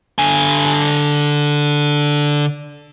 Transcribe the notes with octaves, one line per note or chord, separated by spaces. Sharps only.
D3 G#5